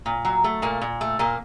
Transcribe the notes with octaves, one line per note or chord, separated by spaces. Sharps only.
A#2
F#3
A3
A#2 A#3
A#2
A3
A#2 A#3